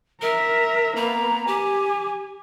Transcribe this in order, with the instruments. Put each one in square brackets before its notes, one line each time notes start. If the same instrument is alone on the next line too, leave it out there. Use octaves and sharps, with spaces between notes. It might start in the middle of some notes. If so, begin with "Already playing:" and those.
[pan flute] A#4 [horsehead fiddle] E5 A#5
[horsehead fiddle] A#3 B3 [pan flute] A#5
[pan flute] G4 [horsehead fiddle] G#5